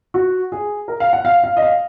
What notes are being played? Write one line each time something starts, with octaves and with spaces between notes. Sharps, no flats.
F#4
G#4
A#4
F5
F#5
F5
F5
D#5
F5